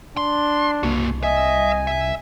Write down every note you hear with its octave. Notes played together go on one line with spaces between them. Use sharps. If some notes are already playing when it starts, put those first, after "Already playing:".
D4 C6
C2 A#3 F#4
D#5 E5 G#5
E5